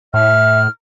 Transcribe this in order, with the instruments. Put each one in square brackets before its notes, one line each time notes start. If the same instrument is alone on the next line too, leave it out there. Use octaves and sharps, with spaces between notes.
[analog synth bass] A2 [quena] E5 [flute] F6